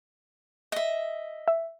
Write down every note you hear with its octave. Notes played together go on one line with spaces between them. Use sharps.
D#5 E5
E5